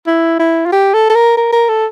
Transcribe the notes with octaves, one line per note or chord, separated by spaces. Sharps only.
E4
E4
F4
G4
A4
A4
A#4
A#4
A#4
A4